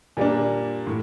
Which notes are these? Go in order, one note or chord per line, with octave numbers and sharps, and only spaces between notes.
A#2 G3 A#3 D4
A2